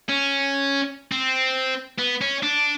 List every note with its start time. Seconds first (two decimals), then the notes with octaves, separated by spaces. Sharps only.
0.09 C#4
1.12 C4
1.99 B3
2.21 C#4
2.43 D4